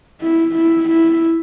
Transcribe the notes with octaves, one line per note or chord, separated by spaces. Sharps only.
E4
E4
E4